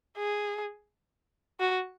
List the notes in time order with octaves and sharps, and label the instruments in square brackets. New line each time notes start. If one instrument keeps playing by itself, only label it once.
[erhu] G#4
F#4